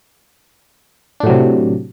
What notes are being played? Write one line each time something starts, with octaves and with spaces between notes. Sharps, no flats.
A2 C3 F#3 D4